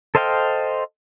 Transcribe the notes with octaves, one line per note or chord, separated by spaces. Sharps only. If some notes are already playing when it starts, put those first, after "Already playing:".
A4 C5 D#5 F5 G5